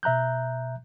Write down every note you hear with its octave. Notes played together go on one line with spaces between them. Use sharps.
B2 E5 A#5 F#6 G6